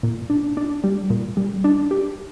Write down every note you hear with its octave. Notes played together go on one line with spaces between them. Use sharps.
A#2
D4
D4
G3
A#2
G3
D4
G4